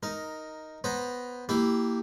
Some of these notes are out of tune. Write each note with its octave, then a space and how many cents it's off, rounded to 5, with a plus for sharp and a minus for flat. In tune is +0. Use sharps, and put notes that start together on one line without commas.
D#4 +5 A#4 +0
B3 +0 C5 +15 A#5 +5
A#3 -10 E4 +0 G4 +0